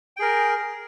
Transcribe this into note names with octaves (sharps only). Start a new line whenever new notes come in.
G#4 A#4 G5